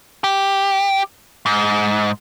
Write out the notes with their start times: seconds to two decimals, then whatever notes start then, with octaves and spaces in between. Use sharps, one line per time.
0.24 G4
1.46 G#2